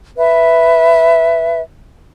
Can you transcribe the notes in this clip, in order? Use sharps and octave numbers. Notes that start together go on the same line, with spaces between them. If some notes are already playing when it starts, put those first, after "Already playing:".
B4 E5